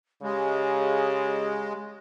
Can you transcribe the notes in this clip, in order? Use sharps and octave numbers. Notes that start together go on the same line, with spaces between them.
C#3 G#3 G4